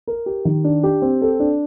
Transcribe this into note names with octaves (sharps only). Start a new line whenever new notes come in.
A#4
G4
D#3
D4
G4
C4
A4
D4